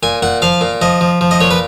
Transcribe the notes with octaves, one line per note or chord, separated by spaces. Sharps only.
A#2 G#5
A#2 F#5
F3 F5
A#2
F3 D#5
F3
F3
D#5
A#2 C#5
B4